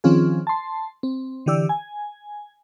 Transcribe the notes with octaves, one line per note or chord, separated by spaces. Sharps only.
D#3 F3 C4 C#4 F4 G#4
A5 C6
C4
D3 E3 G4 D5 E6
G#5